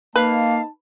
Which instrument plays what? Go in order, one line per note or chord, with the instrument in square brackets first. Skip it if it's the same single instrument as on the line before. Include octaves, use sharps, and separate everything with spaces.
[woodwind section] A#3 [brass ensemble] D#4 D#5 A5 [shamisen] B4 [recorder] F5